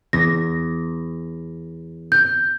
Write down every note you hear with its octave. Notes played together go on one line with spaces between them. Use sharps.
E2 A#6
G6